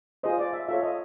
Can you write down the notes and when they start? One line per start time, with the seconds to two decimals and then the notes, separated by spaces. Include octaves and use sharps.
0.23 F4 G#4 C5 D#5
0.38 D5
0.53 E5
0.68 F4 A4 C#5 E5
0.83 D#5